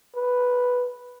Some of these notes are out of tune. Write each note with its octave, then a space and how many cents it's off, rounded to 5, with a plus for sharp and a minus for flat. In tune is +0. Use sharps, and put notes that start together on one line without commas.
B4 +0